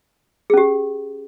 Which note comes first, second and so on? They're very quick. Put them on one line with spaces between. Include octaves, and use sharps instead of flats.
G#4 C#4 G4